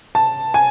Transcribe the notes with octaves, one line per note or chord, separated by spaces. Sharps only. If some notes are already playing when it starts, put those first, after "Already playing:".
A5
G#5